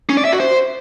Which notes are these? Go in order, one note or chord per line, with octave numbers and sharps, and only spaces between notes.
C#4
D5
E5
F#4
C5